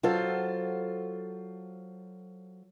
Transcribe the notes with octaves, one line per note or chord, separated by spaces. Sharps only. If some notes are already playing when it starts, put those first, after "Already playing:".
F#3 F4 A4 C5